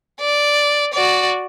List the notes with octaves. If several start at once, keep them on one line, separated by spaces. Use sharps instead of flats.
D5
F#4 D5